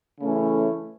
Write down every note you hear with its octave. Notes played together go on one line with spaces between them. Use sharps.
C#3 E3 A3 C#4